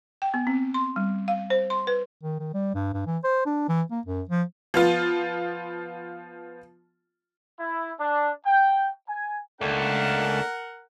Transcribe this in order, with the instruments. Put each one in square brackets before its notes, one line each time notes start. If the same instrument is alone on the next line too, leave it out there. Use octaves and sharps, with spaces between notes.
[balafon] G5
B3
C4
C6
G3
F5
C5
C6
B4
[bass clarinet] D#3
D#3
G3
G2
G2
E3
C5
D4
E3
A#3
F#2
F3
[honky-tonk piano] F3 B3 F4
[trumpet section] E4
D4
G5
G#5
[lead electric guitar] C#2 [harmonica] A3 A#3 D4 [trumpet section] A#4 F#5